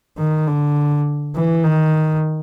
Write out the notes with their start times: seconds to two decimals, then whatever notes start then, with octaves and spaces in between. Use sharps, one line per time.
0.18 D#3
0.47 D3
1.35 E3
1.64 D#3